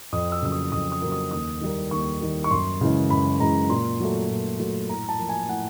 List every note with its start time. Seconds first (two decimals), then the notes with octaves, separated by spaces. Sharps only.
0.12 F2 D#6
0.32 E6
0.42 C#3 F#3 A#3 E6
0.52 D#6
0.72 F2 D#6
0.92 D#6
1.02 C#3 F#3 A#3
1.12 D#6
1.31 D#2 D#6
1.61 D#3 G3 A#3
1.91 D#2 C#6
2.21 D#3 G3 A#3
2.44 C#6
2.51 F#2 C6
2.81 C#3 E3 G#3
3.10 F#2 B5
3.40 C#3 E3 G#3 A#5
3.70 A#2 C6
4.00 F#3 A3
4.30 A#2
4.59 F#3 A3
4.89 A2 A#5
5.09 A5
5.19 F3 A#3
5.29 G#5
5.49 A2 F#5